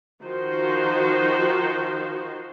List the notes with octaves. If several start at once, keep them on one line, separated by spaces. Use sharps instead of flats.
D#3 F3 D#4 F#4 C5